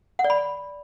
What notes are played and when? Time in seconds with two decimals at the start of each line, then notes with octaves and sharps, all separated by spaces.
0.19 F#5
0.24 D5
0.30 B5